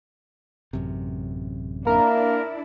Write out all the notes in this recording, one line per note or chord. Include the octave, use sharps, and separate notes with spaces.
A1 F#2 C3
A#3 D4 E4 A#4